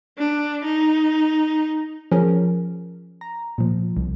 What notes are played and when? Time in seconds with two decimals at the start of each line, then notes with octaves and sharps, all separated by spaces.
0.18 D4
0.64 D#4
2.12 F3 C#4 G#4 A#4
3.21 A#5
3.58 A#2 F3
3.97 C2